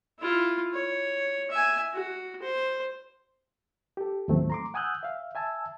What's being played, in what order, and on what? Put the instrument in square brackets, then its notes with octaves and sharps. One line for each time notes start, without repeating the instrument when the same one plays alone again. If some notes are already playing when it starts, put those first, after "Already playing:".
[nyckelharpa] E4 F4
C#5
E5 G#5
F#4
C5
[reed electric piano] G4 A4
D#2 A2 F3 F#3 A3 C4
A#5 C6 D6
F#5 G#5 D#6 E6 F#6 G6
E5 F5
E5 G#5 A5 E6